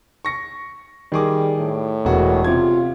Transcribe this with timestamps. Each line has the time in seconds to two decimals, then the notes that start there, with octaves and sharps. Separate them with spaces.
0.25 C#6 A#6 C#7
1.12 D#3 G3 G#4 D6
1.59 A2
2.05 E1 F#4 A#4
2.44 C3 F4 G#6